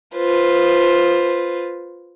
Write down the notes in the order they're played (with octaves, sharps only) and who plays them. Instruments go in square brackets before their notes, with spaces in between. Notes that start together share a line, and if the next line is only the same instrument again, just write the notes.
[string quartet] F4 B4 C5